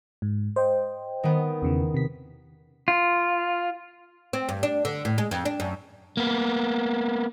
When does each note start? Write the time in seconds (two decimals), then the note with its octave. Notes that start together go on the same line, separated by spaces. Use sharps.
0.22 G#2
0.56 C5 D#5 G5
1.23 D#3 B3
1.62 E2 C#3 E3
1.94 C3 B6
2.88 F4
4.33 C4
4.49 G2
4.63 D4
4.85 D3
5.05 A2
5.18 G#3
5.31 F2
5.45 D4
5.60 F#2
6.17 A#3 B3